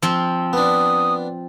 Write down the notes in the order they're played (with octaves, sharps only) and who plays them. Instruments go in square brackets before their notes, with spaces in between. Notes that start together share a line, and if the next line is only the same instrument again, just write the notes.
[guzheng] F3 C4
[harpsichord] B3 D4 [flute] D#6